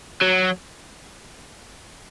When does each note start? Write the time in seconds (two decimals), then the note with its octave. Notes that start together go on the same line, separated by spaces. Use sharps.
0.21 F#3